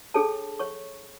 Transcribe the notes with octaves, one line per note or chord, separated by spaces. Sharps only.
D4 G#4 A4 C#5 A5
C#5 C#6